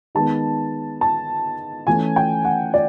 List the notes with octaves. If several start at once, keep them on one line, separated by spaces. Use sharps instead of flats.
D#3 G#3 B3 A5
A5
E3 A3 C#4 G#5
G5
F#5
D5